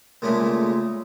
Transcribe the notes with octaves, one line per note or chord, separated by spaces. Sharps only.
A#2 C#3 G#3 A3 B5